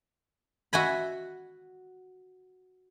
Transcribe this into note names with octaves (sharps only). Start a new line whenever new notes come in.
F#4 E5 G#5 B5